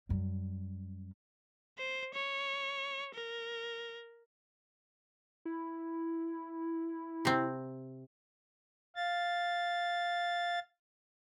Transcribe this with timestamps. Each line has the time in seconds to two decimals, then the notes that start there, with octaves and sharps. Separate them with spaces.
0.09 F#2 G3
1.78 C5
2.14 C#5
3.14 A#4
5.45 E4
7.25 C3 C4
8.96 F5 A6